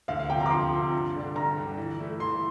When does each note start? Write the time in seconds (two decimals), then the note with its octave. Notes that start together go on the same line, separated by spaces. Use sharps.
0.08 D2 F5
0.19 F5
0.30 C3 F3 G5
0.40 A#5
0.46 D6
0.50 D2 C6
0.72 C3 F3
0.93 G2
1.14 D3 G3 D4
1.35 G2 A#5
1.56 D3 G3 D4
1.78 E3
1.99 A3 E4
2.20 E3 C6